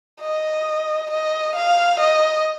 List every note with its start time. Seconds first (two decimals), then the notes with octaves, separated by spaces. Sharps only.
0.21 D#5
1.11 D#5
1.56 F5
2.00 D#5